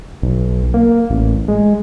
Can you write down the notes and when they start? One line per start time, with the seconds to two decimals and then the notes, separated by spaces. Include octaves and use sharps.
0.22 B1
0.74 A#3
1.10 A1
1.48 G#3